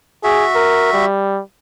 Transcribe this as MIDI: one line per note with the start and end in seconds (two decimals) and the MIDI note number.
0.24 1.05 66
0.24 0.45 68
0.24 1.05 76
0.55 0.92 70
0.93 1.41 55